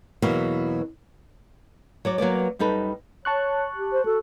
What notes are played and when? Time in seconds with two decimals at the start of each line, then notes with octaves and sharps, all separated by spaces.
0.22 E2 B2 E3 F#3 A#3 B3
2.05 F#3 C#5 D5
2.18 F#3 A#3 B3 D5
2.59 F#2 G3 D#4 A4 B4
3.25 C#5 A5 C#6 F#6
3.75 G4
3.93 C5
4.05 F#4 A4